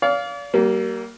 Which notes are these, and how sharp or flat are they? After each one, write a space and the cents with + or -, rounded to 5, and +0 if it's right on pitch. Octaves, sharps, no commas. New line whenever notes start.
D5 -40 F5 +0
G3 -40 A#3 +0